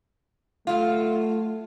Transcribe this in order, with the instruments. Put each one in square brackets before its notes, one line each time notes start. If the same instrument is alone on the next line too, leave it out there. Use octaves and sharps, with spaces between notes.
[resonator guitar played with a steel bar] F#3 F4 [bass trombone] A3